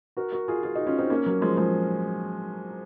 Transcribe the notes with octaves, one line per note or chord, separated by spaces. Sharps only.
F#4 A#4
F#4 A#4
F4 G#4
F4 G#4
D#4 F#4
C#4 F4
C4 D#4
A#3 C#4
F#3 A#3
F3 G#3
F3 G#3